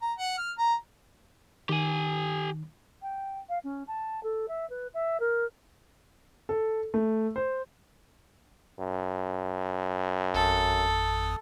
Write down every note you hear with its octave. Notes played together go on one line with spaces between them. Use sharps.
A#5
F#5
F6
A#5
D#3 G4 G#5
G5
F5
C#4
A5
A4
E5
B4
E5
A#4
A4
A3
C5
F#2
G#1 F2 A4 D#6